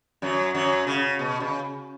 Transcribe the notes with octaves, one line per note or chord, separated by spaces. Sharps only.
F#2 F#3
F#2 F#3
C#3
B2
C#3